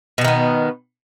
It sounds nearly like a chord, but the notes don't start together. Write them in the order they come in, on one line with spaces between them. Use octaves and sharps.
B2 G3 D#3 B3